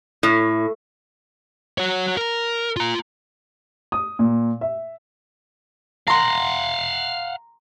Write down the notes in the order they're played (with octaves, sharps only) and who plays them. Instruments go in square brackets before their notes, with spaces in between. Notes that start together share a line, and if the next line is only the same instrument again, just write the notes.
[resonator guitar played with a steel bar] A2
[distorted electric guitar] F#4 C#5
A#4
F4 A#5
[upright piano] D#6
A#2
E5
[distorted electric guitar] F5 F#5 [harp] A#5 C6